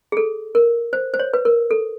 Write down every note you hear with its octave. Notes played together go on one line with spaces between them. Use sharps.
G#4
A4
A#4
C5
C5
C#5
B4
A#4
A4